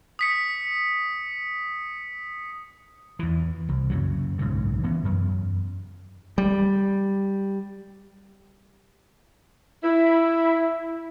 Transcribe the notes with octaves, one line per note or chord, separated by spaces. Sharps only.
D#6 B6 C#7
E2 E3
C2
F#2 C#3 F#3
B1 G#2 C#3
E3 B3 C#4
F#2
G3
E4